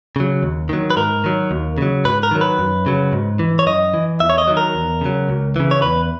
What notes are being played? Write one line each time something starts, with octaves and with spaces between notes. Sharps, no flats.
C#3 F#3
D#2
D#3 F#3
B4
G#2 A#4
D#3 F#3
D#2
C#3 F#3
G#2 B4
A#4
D#3 F#3
B4
F#2
C#3 F#3
G#2
E3
C#5
F#2 D#5
E3
E2 E5
C#5
D#5
D#3 F#3
A#4
E2
C#3 F#3
C#2
C#3 E3
C#5
E2 B4